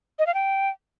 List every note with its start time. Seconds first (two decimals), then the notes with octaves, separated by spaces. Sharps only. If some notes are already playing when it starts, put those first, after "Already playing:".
0.19 D#5
0.27 F5
0.34 G5